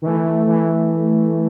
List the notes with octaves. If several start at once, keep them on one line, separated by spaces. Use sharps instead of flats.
D#3
E3 A3
E3